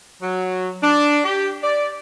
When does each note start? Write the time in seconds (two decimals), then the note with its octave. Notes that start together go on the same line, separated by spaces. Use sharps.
0.22 F#3
0.82 D4
1.25 G4
1.64 D5